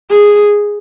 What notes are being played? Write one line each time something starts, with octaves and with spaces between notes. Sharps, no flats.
G#4